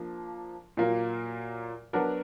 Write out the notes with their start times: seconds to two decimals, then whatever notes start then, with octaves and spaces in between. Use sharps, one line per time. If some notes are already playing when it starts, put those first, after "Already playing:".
Already playing: F3 A#3 D4
0.77 A#2 F#3 A#3 F4 A#4
1.93 F#3 B3 D4 F#4 A#4